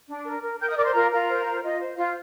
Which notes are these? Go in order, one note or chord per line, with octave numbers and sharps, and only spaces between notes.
D4
A#4
A#4
A#4 G5 G6
D#5 D#6
A#4 D5 D6
C5 C6
F4 A#4 A#5
F4 A#4 A#5
C5
F4
F4 D#5
C5
F4 C5 F5